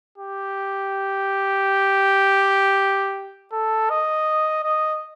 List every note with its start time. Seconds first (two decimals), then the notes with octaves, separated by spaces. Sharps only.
0.18 G4
3.52 A4
3.90 D#5
4.64 D#5